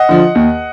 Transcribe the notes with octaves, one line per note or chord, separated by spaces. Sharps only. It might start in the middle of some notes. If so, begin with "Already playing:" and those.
Already playing: D#5 F#5
D3 F3
D#2